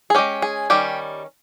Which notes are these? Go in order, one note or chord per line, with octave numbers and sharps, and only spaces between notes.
G#4
G#3 C#4 G4
G#4
D#3 G3 C#4 G4